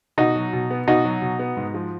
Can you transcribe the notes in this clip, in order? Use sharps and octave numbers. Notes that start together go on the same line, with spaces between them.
B2 D#4 F#4
F#3
B2
B3
B2 D#4 F#4
F#3
B2
B3
G#2
F3